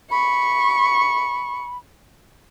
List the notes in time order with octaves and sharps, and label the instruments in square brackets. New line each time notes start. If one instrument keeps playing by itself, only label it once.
[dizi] B5 [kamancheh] C#6